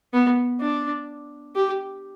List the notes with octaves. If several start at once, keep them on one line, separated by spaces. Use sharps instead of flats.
B3
D4
G4